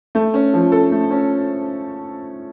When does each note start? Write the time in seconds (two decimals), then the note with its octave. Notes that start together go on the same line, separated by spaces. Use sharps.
0.15 A3
0.34 C#4
0.53 F3
0.72 A4
0.92 A3
1.11 C#4